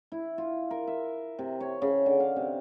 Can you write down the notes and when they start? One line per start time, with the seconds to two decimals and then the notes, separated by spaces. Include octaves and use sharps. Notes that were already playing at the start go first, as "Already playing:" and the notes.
0.12 E4
0.38 F4
0.71 A#4
0.87 E5
1.39 C3
1.60 C#5
1.82 C#3
2.06 D3
2.20 F5
2.36 C3